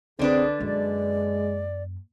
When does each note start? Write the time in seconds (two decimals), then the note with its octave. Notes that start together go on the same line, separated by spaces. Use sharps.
0.19 C2 D3 C4 D4 G#4 B4
0.60 F#2 G#3 A#3 D5